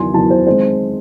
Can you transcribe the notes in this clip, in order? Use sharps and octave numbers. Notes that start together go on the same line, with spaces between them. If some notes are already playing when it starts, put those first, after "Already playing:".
Already playing: E2 D#3 F#3 G#5 C6
E2 D#3 F#3 A5
C5
D#3 G#3 C4 C5